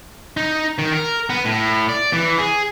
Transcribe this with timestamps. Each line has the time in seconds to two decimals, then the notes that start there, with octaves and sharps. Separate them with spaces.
0.37 D#4
0.78 D#3
0.93 A#4
1.30 B3
1.45 A2
1.89 D5
2.13 E3
2.39 G#4